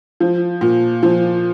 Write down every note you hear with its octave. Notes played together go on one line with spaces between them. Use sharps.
F3
A#2
F3